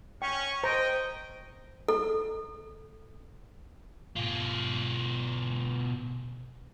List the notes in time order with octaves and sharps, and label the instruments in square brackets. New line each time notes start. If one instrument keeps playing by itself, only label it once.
[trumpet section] C#4 C#6 [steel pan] G5
[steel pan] C5 A#5 [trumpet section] D#5 G5
[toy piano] A4
[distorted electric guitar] B2 F4